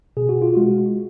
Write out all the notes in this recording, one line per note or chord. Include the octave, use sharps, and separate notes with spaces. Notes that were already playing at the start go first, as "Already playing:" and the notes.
B2 G#4
F#4
F4
G#3 F#4